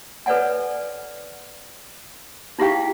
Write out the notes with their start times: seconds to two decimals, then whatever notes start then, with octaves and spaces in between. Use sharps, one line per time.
0.26 A4 B4 C#5 D5 F#5 G#5
2.59 D#4 E4 G4 G#4 F5 G5